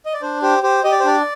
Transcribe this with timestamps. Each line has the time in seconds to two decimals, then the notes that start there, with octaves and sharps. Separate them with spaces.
0.06 D#5
0.14 D5
0.22 D4 C5
0.42 G4 C5
0.63 G4 C5
0.84 G4 D#5
0.92 D5
1.00 C5
1.04 D4 D5